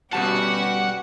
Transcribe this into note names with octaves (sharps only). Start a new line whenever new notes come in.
B2 G3 C#4 F#4 G4 B4 F#5 A5